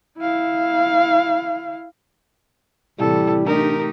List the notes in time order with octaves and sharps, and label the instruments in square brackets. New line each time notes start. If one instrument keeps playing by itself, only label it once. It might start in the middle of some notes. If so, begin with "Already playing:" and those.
[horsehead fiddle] E4 F5
[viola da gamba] A2 C3 E3 [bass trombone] G3 [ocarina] E4 [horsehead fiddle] A4
[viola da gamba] A3 D#4 G4 [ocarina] D4 [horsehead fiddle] A#4